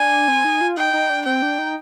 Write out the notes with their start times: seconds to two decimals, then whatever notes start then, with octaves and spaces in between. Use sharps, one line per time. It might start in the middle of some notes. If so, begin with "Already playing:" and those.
Already playing: D4 G#5
0.28 C4
0.45 D#4
0.61 F4
0.77 D#4 G5
0.93 D#4
1.10 D4
1.25 C4 G5
1.42 D4
1.58 D#4